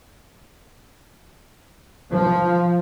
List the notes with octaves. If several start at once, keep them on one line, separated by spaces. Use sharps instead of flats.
F3